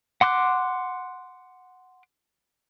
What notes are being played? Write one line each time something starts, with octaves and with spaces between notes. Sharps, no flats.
F#5 C6 D6 F#6